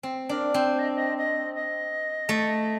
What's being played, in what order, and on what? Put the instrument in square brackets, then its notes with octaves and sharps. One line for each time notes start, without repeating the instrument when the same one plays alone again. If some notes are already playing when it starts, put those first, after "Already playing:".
[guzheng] C4
[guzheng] D4 [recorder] A#4
[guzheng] C4 [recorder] C5
[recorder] D#5
D#5
D#5
D#5
[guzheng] A3